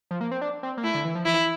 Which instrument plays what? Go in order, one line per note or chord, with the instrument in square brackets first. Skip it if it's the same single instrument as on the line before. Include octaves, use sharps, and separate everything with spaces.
[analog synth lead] F3
A#3
C4
D4
C4
A#3
[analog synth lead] A3 [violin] E4
[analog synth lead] D3
E3
F3
[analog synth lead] E3 [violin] E4